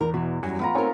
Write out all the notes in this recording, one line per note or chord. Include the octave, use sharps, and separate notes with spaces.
E2 A#4
B2 E3 F#4
F#2 F#3 G3 F#4 G#5
A3 B3 F4 A#5
A3 C4 D#4 A#4 C#5 G#5